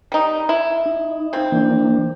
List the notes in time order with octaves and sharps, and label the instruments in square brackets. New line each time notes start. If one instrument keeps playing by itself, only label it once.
[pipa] G3 D#4
E4
[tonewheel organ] D#4
[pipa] C#3 C4
[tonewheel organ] E3 A#3 D4